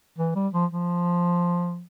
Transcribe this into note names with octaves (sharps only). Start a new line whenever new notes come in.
E3
G3
F3
F3